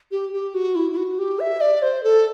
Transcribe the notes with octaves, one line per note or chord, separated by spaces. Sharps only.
G4
G4
F#4
E4
E4
F#4
G4
E5
D5
C5
A4